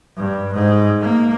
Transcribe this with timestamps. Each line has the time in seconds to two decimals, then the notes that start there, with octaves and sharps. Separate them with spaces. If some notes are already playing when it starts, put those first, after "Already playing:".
0.17 G2
0.54 G#2
1.01 A#3